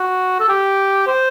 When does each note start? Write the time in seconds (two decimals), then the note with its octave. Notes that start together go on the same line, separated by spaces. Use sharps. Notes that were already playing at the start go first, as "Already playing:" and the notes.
Already playing: F#4
0.40 A4
0.49 G4
1.07 C5